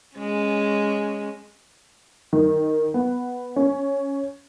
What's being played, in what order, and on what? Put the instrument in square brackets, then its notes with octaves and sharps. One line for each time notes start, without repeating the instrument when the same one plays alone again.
[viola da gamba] G#3 C#4
[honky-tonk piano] D#3
B3
C#4